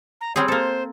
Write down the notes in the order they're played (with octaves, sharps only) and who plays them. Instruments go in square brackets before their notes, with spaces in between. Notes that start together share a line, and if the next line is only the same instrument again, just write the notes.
[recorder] A#5
[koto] G3 C4 G#4 [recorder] C#5
[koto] A#3 A4 [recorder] C5